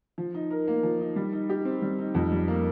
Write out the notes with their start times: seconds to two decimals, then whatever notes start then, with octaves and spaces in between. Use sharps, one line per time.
0.18 F3
0.34 D#4
0.50 A#4
0.68 A#3
0.83 F3
1.00 D#4
1.16 G3
1.33 D#4
1.49 G4
1.65 C4
1.82 G3
1.99 D#4
2.15 F2
2.32 G3
2.48 A#3